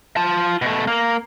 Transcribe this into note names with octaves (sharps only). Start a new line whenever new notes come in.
F4 A5
B2 A3
A#3